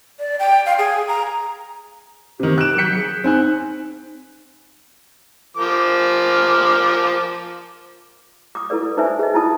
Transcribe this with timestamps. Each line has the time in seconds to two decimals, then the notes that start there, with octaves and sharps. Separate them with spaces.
0.19 D5
0.40 G5
0.66 F5
0.79 G#4
1.08 A#5
2.40 C3 D#3 G4
2.58 F#6 D7 E7
2.78 F#3 G6 B6 C#7
2.95 G#4
3.24 C4 D#4 G#5 F#6
5.57 F3 A#4 D6
8.55 D6 D#6
8.70 E4 A4 B4 D5
8.97 D#4 B4 C5 E5 G#5
9.19 G#4 D#5
9.34 E4 F4 A5 D#6